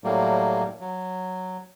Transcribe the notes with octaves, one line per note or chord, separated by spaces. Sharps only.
A2 F#3 G3 A#3
F#3